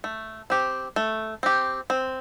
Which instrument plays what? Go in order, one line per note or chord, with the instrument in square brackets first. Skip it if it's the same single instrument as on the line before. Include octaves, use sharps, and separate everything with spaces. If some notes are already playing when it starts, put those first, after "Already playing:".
[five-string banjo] A3
C4 G4
A3
C4 G4
C4